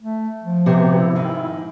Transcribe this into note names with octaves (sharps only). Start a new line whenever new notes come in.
A3
F3
C3 F#3 G#3 B3 G4
E4
G#2 D#3